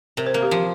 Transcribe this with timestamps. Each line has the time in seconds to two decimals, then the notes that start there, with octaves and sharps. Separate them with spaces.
0.17 C3 A#4
0.27 C5
0.34 A#3 A#4
0.43 G4
0.51 F3